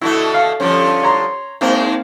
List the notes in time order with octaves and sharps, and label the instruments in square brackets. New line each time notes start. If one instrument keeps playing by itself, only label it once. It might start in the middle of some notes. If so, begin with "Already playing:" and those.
[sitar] B2 D3 A3 [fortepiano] E4
[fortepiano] F5
[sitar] G2 D3 F3 [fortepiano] C#4
[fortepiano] C#5 A#5 C6
[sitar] G#2 G#3 D4 [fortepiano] A#3 C4